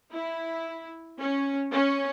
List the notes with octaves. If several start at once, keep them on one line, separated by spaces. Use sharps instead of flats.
E4
C#4
C#4